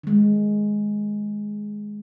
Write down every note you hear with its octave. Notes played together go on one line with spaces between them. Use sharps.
D#3 G#3